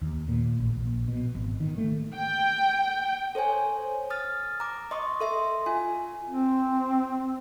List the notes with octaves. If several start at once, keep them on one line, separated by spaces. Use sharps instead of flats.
D#2
A#2
A1
A#1
B2
G#1
D#3
A3
G5
A4 C5 C#5 G#5
D#6 F6 A6
A#5 D6
D#5 C6 C#6 D#6
A4 E5 C6
F4 G#5
C4